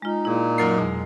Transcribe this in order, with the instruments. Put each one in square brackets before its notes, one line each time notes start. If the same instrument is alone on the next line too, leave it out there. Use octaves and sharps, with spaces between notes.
[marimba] G#3 F4 [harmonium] D#4
[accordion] A#2 [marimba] E4 G#4
[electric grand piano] F#2 A#4 C7 [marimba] F#3 A#3
[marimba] F2 B2 [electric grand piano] G#3